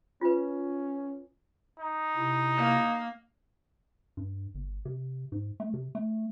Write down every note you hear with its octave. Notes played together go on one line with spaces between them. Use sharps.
C#4 F4 B4
D#4
C3 E4
A#3
G2
G1
C3
G#2
A3
C3
A3